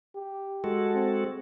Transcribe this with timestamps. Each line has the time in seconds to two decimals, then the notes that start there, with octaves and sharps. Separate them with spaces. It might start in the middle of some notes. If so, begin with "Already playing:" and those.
0.15 G4
0.64 G#3 F#4 A4
0.95 C4